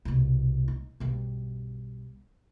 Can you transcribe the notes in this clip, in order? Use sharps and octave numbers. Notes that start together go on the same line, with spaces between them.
C2 B2
D#4
B1 G2